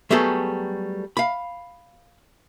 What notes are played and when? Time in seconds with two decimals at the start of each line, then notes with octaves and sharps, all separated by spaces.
0.11 F#3 G3 A3 B3 G#4 A4
1.17 F5 B5